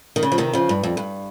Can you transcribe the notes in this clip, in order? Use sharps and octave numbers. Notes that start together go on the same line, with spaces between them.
D#3
C#3
F3
C3 D#3
C#3 F3
G2
F2
G2